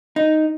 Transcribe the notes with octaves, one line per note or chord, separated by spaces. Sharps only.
D#4